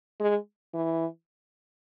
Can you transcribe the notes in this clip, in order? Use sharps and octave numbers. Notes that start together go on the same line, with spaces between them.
G#3
E3